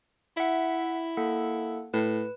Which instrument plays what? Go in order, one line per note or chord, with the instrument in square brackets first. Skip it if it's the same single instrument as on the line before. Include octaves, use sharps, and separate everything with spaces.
[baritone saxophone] E4 [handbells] E5 F#5
[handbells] A#3 A4 F#5
[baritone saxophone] A2 [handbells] B4